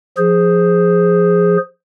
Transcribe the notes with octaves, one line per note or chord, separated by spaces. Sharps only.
F3 G#4 C5